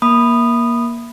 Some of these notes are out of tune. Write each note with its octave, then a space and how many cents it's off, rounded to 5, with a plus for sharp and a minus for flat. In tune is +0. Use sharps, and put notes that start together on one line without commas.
A#3 +20 B5 +0 D#6 -15